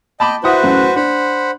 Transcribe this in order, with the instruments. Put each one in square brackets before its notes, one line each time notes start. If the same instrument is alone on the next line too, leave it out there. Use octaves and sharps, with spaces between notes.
[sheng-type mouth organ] D#5 G5 [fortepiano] A5 B5 D6
[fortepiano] E4 F#5 D#6 [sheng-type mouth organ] F#4 B4 C5
[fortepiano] A1 F#2 A3
[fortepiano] D4 [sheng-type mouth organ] C5 F#5 B5